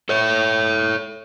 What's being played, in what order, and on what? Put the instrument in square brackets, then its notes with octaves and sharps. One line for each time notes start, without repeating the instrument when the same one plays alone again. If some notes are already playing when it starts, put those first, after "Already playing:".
[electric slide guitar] A4 C#5